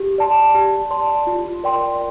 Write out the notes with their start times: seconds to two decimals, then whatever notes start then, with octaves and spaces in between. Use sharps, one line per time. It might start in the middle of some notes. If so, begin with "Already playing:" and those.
Already playing: G4
0.18 D5 A5 C6
0.54 G4
0.91 D5 A5 C6
1.27 F4
1.63 A#4 D5 G5 C6